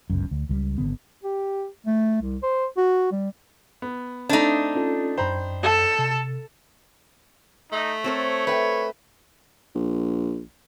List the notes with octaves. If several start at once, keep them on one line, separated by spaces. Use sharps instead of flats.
G1 C#2 F#2
D2
C#2 F3 G3
G#1 D3 B3
G4
A3
C2
C5
F#4
G3
B3
A3 C4 D4 D#4
C#4 F4 A4
F#2 C5 G5 A#5 B5
A4
C3
A3 D#4
C4 A4 A#4 C#5
A3 B4 F#5 G5
A#1